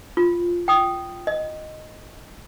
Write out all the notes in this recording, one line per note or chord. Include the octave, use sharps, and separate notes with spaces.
F4
G5 D#6
D#5